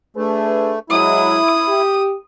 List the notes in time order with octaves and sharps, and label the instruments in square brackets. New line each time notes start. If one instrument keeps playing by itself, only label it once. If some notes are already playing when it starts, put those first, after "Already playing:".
[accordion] A3 [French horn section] D4 G#4 B4
[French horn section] F#3 G#3 [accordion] E4 [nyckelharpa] D#6
[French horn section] G4